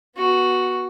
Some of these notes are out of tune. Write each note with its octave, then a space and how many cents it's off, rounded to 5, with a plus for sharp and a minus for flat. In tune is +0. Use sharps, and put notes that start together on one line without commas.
B3 -20 F#4 +0